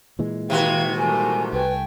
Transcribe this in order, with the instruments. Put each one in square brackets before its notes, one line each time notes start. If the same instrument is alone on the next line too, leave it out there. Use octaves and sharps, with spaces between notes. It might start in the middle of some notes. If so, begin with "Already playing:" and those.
[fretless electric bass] A#2 E3 G#3
[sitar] C3 D#3 F#4 [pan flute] F5 [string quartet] G5 G#6
[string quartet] G3 A3 A#3 [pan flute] G#5
[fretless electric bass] C2 [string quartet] A3 G5 G#5 [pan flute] B4